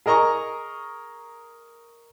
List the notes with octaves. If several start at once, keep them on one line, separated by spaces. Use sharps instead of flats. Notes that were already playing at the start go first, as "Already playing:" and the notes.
G#4 A#4 D#5 A#5 C#6